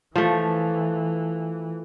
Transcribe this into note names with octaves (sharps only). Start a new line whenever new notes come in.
E3 F3 A3